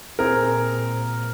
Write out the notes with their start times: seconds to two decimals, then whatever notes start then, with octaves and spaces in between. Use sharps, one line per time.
0.19 A#2 C4 G#4 A#4